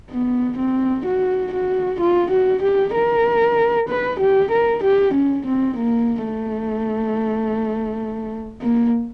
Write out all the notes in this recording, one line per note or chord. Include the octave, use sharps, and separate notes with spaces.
B3
C4
F#4
F#4
F4
F#4
G4
A#4
B4
G4
A#4
G4
C#4
C4
A#3
A3
A#3